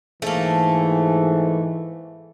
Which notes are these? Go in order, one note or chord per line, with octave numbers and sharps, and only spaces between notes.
G#2 E3 A3 A#3